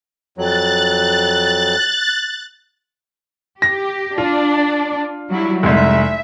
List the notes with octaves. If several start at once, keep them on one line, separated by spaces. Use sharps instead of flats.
F2 F#3 F#6 A6
G4 A#6
D4 F4
F#3 G3 E4
F1 C2 G#3 E5